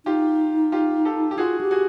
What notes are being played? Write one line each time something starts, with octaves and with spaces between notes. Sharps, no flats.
D#4 F4 G4
F4 G4
G4 A4
G4
F4 F#4 G#4
G4
F#4 G#4